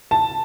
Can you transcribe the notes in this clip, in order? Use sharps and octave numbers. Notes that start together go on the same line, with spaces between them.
A5